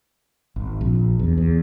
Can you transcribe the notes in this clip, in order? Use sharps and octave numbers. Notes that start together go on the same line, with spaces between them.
G#1
A#1
E2
E2